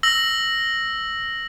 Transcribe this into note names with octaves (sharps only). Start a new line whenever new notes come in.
E6 A#6 F#7